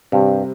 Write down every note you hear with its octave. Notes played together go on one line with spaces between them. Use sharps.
G2 C3 G3 C4